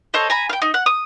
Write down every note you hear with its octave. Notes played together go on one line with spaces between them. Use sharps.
A4 C5 C#5 D#5
G#5 A#5 B5
F5 G5
D#4
F#5
D#6